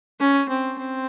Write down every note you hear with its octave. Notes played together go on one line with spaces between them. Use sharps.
C#4
C4
C4